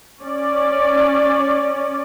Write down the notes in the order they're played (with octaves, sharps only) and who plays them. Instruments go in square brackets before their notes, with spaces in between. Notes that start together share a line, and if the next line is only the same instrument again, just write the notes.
[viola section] C#4 D5